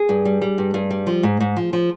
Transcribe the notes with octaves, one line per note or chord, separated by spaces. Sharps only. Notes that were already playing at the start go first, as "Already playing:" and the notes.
Already playing: G#4
G2
G3
G3
G2
G2
G3
F3
G#2
G#2
F3
F3